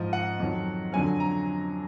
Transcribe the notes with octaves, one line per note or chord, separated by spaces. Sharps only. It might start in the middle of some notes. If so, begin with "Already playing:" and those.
Already playing: G#2 F3 D#5
F#5
F2 D#3 F#3
F2 D3 F#3 G#5
A#5